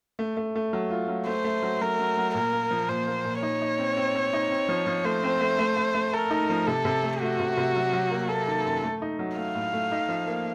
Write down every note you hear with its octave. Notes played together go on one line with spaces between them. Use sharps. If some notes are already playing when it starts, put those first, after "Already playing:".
A3
A3
A3
F#3
F4
F#3
A3 C5
A3
F#3
F#3 A#4
F#3
F#3
A#2 A#4
A#3
F3
A#2 C5
A#3
A#2
D#4 C#5
D#4
C4
C4
C4
D#4
C4
F3
F3
A3 C5
C4
A3
A3
A3
A3
A4 A#4
D#4
F3
C3 A4
C3
A3
A3 F#4
C3
C3
F#3
F#3
A#3
A#3 A4
D#3
F#2
A3
D#4
F#3
A3 F5
A2
A3
D#4
F3
A#3